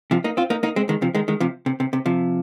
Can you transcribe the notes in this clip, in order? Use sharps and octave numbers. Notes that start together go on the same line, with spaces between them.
C3 F3
A#3 D#4
C4 F4
A#3 D#4
A#3 D#4
G#3 C4
D#3 G#3
C3 F3
D#3 G#3
D#3 G#3
C3 F3
C3
C3
C3
C3 F3